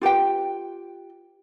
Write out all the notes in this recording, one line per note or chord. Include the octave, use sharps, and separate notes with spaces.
F4 G4 B4 G5